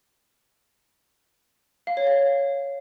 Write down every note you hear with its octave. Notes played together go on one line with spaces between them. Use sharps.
F5
C#5
F5